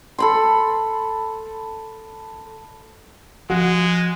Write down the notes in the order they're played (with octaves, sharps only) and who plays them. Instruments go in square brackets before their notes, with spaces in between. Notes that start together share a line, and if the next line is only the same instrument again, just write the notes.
[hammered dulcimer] A4 B5 C6
[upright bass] F3 [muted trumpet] G#3 [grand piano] F#4